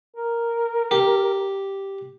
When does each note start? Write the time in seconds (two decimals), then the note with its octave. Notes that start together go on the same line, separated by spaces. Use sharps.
0.16 A#4
0.91 G4